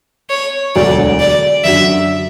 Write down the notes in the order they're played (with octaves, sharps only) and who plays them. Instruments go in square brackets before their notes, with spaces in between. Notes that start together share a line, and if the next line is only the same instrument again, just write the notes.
[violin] C#5
[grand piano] E1 D2 D3 F#3 [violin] D5
[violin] D5
[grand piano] F#2 D3 F#3 [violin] E5